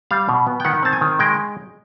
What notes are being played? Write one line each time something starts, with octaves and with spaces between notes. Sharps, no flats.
G3 F5
B2
B3
G5
D#3 F#5
C4 A5
G#5
D#3
G#3 G5